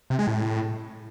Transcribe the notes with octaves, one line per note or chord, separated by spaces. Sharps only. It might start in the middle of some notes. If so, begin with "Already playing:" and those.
C3
G#3
A2